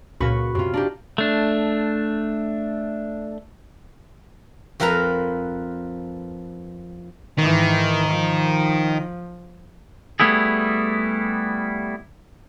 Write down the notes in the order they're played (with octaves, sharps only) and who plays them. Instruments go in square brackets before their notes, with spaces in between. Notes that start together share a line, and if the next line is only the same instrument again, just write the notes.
[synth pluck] C#2 A#2 C#3 [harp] F#4 B4 C#6
[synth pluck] F#2 [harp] C3 F4
[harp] D4 D#4 G4
[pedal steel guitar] A3 D4
[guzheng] F2 F3 A#4 B4 A#5
[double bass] G#2 E3 [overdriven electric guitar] D#3
[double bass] F3
[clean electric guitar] G3 A3 B3 E4 G#4